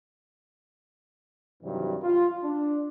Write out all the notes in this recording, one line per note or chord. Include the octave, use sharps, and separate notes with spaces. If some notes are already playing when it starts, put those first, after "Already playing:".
G2 C3 D#3 E3 F#3 G3
F4
D4